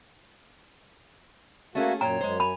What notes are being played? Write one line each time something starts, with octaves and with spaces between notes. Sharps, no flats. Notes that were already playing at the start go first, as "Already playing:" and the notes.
A3 A#3 C#4 F#4 G#4 E5
F#2 A#2 C#5 G5 A#5
F#2 G#3 C5
G#5 B5